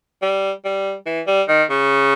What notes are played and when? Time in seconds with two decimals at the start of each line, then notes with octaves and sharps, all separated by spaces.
0.22 G3
0.65 G3
1.06 E3
1.27 G3
1.48 D#3
1.70 C#3